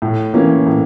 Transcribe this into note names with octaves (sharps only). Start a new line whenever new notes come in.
A2
E3 A#3 C#4
A2